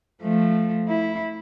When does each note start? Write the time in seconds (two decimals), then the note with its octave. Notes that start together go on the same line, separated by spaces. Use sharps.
0.22 F3 A3
0.89 E4